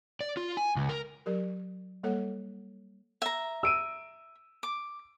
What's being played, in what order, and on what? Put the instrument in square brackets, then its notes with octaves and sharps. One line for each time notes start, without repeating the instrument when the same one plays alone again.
[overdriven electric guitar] D5
F4
G#5
C#2
A#4
[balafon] F#3 G4 A#4
G3 A#3 A4 C#5 F#5
[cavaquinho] E5 A#5
[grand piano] E6 D7 D#7
[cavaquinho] D6